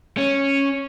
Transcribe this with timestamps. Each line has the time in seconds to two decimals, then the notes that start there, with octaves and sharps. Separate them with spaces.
0.17 C#4